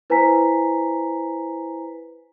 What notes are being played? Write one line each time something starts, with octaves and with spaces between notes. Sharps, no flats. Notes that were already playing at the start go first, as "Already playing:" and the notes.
E4 B4 C5 G#5 A#5 B6